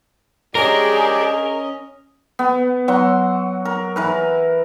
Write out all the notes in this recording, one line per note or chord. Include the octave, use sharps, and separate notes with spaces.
G#3 C#4 D4 G4 G#4 A#4 D#5
B3
F#3 F#5 C6
A#4
E3 A#4 B4